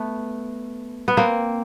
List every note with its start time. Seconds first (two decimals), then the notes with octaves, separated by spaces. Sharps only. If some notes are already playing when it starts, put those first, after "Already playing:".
Already playing: A3 B3
1.08 B3
1.17 A#3 C4